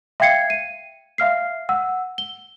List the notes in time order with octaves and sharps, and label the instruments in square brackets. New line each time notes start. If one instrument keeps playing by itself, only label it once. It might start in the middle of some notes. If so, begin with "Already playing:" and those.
[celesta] E5 F5 G5 G#6 C7 C#7
D#7
E5 F5 F6 C7
F#5 E6
G7